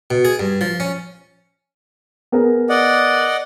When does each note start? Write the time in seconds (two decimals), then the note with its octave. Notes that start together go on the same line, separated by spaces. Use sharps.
0.11 B2
0.25 G#4
0.40 G2
0.61 F3
0.80 C#4
2.32 B3 G#4 A#4
2.69 D5 D#5 F#5